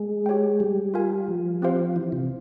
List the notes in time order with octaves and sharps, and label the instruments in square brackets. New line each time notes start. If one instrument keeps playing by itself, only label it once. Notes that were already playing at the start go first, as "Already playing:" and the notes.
Already playing: [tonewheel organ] G#3
[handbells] G4 C#5 G5
[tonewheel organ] G3
[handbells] F4 A#4 F5 G#5
[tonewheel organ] F3
[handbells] C4 G4 C5 F5
[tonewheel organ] E3
C3